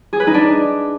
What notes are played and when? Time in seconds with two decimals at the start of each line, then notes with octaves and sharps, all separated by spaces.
0.13 G#4
0.20 B4
0.27 D#4
0.34 D4